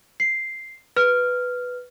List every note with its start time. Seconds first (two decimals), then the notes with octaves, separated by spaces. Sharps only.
0.20 C7
0.96 B4 F6